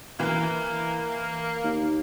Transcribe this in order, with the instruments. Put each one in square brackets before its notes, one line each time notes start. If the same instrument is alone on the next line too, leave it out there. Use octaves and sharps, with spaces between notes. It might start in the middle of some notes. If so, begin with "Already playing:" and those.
[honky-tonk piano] E3 [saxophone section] A#3
[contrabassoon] D#2